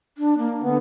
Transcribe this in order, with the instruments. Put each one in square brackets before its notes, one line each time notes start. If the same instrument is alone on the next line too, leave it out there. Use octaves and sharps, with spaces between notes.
[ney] D4
A#3
[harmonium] D3 B3